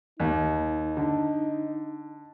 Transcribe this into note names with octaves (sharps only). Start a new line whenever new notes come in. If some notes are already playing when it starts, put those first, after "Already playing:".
D#2 D#4
D3